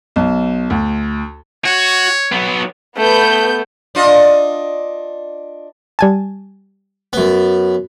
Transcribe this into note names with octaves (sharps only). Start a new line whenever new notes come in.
B1
D2
F#4 C#5
F#3 B3
A3 B3 G6
D4 F4 D#5
G3 G#5 A5
F#2 B3